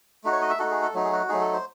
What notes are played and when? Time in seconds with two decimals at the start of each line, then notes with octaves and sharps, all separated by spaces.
0.24 A3 D#4 F#4
0.32 C#5
0.41 D#5
0.50 E5
0.59 A3 D#4 F#4 A4
0.71 G#4
0.82 A4
0.94 F#3 A3 D#4
1.04 G#4
1.12 F#4
1.29 F#3 A3 D#4 G#4
1.41 A4
1.53 C5